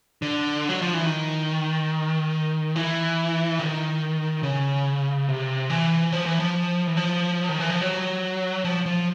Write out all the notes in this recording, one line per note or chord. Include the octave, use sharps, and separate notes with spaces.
D3
F#3
F3
E3
D#3
E3
D#3
C#3
C3
E3
F3
E3
F3
E3
F3
D#3
E3
F3
F#3
F3
F3